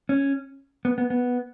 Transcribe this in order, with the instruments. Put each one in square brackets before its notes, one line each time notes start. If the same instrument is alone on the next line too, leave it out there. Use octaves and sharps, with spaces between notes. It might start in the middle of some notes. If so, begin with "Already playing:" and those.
[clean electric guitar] C#4
B3
B3
B3